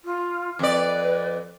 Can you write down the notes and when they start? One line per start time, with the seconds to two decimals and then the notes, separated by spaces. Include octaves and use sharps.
0.05 F4
0.59 F2 B4 D5